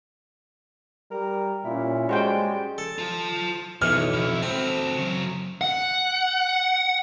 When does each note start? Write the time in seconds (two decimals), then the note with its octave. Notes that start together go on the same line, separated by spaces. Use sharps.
1.11 G3 A#4
1.65 A#2 C#4 E4
2.09 G3 G#3 F#4 C5 G5
2.78 A4
2.98 F4 A5
3.82 B1 E2 E3 C#5 F6
4.13 F2 E4
4.42 C4 F#4 A4
4.96 C#3 F#3
5.61 F#5